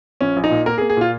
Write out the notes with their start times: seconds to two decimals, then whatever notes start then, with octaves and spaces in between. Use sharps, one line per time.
0.20 A#1 C#4
0.36 A#1
0.44 D#4
0.51 A#2
0.66 A#3 A#4
0.78 G#4
0.81 A#3
0.90 G#4
0.97 A#2 F4